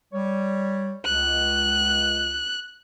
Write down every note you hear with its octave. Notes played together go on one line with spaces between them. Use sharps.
G3 C#5
C#2 F#6